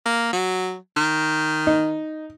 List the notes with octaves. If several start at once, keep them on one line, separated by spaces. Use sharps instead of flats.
A#3
F#3
D#3
D#4